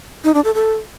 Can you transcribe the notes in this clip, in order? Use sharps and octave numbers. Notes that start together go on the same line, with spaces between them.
D#4
D4
A4
A4